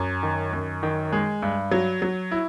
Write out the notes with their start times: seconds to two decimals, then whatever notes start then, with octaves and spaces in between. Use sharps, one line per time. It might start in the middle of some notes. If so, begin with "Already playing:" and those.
Already playing: F#2
0.23 D#3
0.53 F#2
0.83 D#3
1.12 G#3
1.43 G2
1.71 F#3
2.02 F#3
2.31 E4